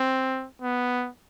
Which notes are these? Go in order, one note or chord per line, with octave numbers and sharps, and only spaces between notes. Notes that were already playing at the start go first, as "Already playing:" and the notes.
Already playing: C4
B3